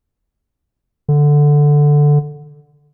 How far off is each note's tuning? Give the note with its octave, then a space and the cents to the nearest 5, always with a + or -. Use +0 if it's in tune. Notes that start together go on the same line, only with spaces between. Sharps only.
D3 +0